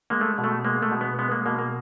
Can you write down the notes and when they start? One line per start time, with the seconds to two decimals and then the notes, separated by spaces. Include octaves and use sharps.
0.10 G#3 A#3
0.21 A3
0.38 B2
0.44 A3
0.65 G#3 A#3
0.82 A3
0.91 B2
1.01 B3
1.19 G#3 B3
1.31 A#3
1.46 B2 A#3
1.59 A#3